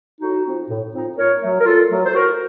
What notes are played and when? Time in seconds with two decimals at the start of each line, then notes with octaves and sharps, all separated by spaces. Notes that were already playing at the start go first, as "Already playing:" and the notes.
0.21 A2 D#4 F#4
0.45 F3 C4 D#4
0.70 A2
0.93 F3 C4 D#4
1.17 A#2 A#4 C#5
1.41 F#3 A3
1.59 A#4
1.66 A#2 F4 A4
1.90 F#3 A3
2.05 C5
2.14 A2 F#4 A#4